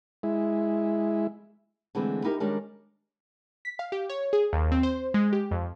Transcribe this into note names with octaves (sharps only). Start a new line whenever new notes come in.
G#3 E4
D3 E3 G#3 A3 C4
D#4 E4 G4 A#4
D#3 G3 G#3 C#4 D4 A#4
B6
F5
G4
C#5
G#4
D#2
C4
C5
G#3
G4
F2